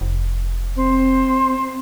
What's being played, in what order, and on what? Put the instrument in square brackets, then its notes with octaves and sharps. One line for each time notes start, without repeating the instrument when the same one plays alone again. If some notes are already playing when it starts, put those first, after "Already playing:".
[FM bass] F1
[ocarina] C4 [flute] C5